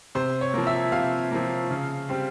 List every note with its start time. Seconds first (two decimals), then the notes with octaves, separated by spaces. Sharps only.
0.15 C3 C5
0.41 C#5
0.54 F3 A#3
0.67 E5
0.92 C3 F5
1.31 F3 A#3
1.70 C#3
2.09 G3 C4